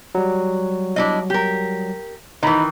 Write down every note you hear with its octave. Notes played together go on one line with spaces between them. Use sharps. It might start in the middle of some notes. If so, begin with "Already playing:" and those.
F#3 G3
D4 E4 D#5
G4 A#4
D#3 E3 D#4 A#5 B5